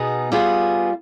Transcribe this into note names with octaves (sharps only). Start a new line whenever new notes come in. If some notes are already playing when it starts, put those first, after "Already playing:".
Already playing: B2 B3 D#4 G#4
G3 B3 F4 G#4